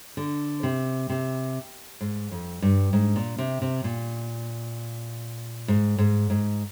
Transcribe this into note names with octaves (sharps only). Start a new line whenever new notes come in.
D3
C3
C3
G#2
F2
G2
G#2
A#2
C3
C3
A#2
G#2
G#2
G#2